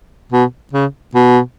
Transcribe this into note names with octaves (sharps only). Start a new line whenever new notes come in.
B2
C#3
B2